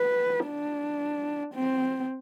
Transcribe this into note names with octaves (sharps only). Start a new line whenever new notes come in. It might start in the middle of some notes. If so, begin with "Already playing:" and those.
Already playing: B4
D4
C4